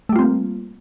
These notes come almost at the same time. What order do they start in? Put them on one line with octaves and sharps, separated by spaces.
A3 G3 F4 C4 A#3